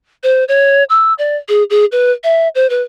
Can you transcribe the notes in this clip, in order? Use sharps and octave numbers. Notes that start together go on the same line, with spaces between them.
C5
C#5
E6
D5
G#4
G#4
B4
E5
C5
B4